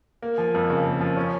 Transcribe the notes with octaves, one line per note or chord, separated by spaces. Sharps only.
A#3
F3
F2
C#3
A#3
F3
C#4